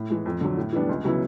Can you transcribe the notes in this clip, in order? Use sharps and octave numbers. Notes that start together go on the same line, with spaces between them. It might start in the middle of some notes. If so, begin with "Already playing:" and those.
Already playing: A2
E3 G#3
F2
D3 F#3
A2
E3 G3 B3 D4
C#2
C#3 F#3 B3 E4